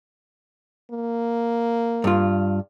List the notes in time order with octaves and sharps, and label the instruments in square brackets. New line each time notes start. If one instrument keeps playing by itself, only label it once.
[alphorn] A#3
[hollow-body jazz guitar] G2 F4